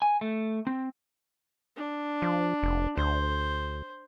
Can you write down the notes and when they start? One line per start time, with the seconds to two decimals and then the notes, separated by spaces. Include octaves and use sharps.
0.02 G#5
0.21 A3
0.67 C4
1.77 D4
2.22 F3
2.63 F1
2.97 D2 C5